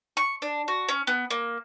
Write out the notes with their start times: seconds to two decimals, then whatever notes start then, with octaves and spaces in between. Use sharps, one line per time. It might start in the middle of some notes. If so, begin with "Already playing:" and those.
0.17 C#6
0.42 D4
0.68 F#4
0.89 C#4
1.07 B3
1.31 A#3